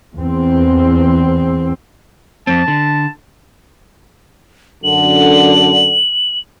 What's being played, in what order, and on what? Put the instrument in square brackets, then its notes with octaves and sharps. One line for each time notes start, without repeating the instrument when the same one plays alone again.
[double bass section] E2 C4
[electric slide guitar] F2 C4 [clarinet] A5
[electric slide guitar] D3
[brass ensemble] F#2 D3 [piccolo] F#7